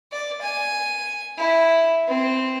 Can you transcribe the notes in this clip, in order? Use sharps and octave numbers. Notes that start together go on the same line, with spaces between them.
D5
G#5
E4
C4